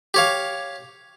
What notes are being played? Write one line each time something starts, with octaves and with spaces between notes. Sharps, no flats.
G4 C#5 F5